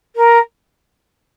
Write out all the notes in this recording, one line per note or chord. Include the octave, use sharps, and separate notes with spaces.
A#4